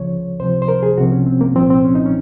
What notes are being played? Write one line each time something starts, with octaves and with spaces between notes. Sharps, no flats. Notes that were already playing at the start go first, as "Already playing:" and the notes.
Already playing: C#2 C#3 F3 C#5
C#2 C3 F3 C5
C5
A#4
G#4
C2 C3 F3 F#4
C#4
C4
A#3
C2 A#2 F3 C4
C4
C#4
D#4
C#4